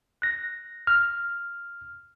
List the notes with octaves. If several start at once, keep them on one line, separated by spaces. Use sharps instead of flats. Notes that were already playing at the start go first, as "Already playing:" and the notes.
F#6 A#6
F6